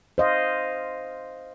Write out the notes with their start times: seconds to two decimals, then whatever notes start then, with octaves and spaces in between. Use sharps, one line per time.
0.18 C5 D#5 F5